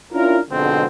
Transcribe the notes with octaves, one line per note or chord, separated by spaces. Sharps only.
C#4 D4 E4 F4 A#4
F2 G#2 B2 D3 G#3 C4